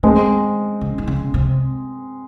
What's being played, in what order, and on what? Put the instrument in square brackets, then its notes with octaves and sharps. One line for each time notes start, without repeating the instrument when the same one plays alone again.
[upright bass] D#3 [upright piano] G#3 C4
[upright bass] C#3
D#3
C#3
C3